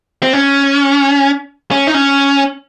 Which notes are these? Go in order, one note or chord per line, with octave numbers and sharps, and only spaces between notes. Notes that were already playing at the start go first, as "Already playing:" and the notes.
C4
C#4
C#4
D#4
C#4